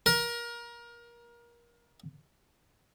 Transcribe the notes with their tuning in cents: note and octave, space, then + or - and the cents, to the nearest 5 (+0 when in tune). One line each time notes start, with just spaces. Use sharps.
A#4 +25